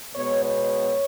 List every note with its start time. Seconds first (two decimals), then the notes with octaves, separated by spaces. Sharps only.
0.15 B2 G#3 B3 C#5
0.45 C#5